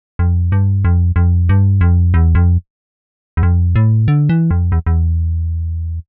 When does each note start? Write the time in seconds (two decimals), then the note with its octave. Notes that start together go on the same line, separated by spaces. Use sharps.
0.19 F2
0.52 G2
0.85 F2
1.16 F2
1.49 G2
1.81 F2
2.14 E2
2.35 F2
3.37 E2
3.43 F2
3.76 A2
4.08 D3
4.29 E3
4.51 F2
4.72 E2
4.86 E2